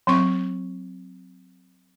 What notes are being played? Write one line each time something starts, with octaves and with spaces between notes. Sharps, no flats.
F#3 C4 C#6